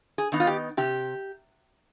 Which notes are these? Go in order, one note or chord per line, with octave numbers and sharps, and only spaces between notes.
G#4
D#3 B3 D#4
F4
G4
C3 G4